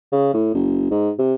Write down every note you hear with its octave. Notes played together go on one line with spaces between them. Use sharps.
C#3
A2
F#1
G#2
C3